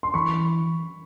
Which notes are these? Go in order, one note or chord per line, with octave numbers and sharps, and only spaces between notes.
C6
E3 B5 C#6